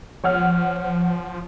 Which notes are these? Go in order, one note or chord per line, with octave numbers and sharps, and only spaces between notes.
F3 C#5 F#5 F6